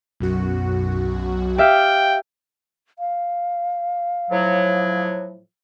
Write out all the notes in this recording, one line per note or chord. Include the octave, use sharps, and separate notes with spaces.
B1 F#2 F#4
G4 E5 F5 G5
F5
A2 F3 F#3